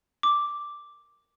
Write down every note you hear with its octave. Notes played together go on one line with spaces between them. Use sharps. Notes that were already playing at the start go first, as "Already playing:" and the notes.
D6